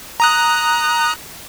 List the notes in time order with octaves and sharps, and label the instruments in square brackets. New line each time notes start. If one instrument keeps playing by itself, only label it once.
[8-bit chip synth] A#5 D#6 F#6